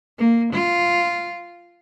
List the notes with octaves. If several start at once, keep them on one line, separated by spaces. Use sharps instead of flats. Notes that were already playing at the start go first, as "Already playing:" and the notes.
A#3
F4